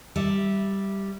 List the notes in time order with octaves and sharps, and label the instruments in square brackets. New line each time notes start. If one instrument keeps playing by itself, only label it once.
[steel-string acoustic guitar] G3 E5